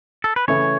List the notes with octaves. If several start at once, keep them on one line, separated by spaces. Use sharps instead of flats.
A4
B4
C#3 E3 A3 E4 C#5